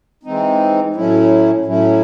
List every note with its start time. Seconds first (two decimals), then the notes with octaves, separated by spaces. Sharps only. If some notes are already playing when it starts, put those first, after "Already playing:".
0.23 E3 G#3 C4 D#4
0.94 A2 F#3 A3 C#4 E4
1.65 A2 F#3 A3 C#4 E4